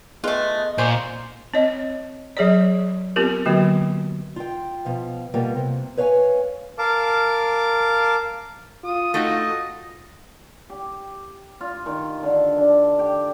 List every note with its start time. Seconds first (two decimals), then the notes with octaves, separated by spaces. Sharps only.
0.24 A3 B3 F4 G#4 D#5 F#6
0.78 A#2 C5 D5 G#5 C#6
1.54 C4 C#5 D#5
2.37 F#3 G#4 C#5 D5
3.16 B3 C4 F4 G4 A#4
3.46 D3 F#3 A#3 F#4
4.36 F4 G5
4.85 B2 F3 F5
5.34 B2 G3 A#3 F4
5.56 C3
5.97 B4 C#5 F5 G5 G#5
6.78 A#4 F5 A5 D6
8.84 F4 D#6
9.14 A3 D#4 F#4 D#5
10.70 G4
11.61 F4
11.86 D#3
12.23 D3
12.58 D4
12.99 G4